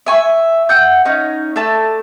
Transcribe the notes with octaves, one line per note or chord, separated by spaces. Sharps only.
E5 G#5 C#6
F#5 E6 G6
C#4 D#4 C#5
A3 D5 A5 E6